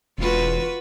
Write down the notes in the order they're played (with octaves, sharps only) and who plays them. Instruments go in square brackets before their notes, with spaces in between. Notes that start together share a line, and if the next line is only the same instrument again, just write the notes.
[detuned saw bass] E1 [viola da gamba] F4 F#4 B4